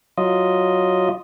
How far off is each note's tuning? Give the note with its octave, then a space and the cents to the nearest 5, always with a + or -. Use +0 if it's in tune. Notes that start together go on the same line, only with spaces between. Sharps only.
F#3 +0 F4 +0 D#5 +0